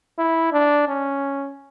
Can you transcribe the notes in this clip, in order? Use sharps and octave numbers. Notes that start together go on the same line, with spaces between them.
E4
D4
C#4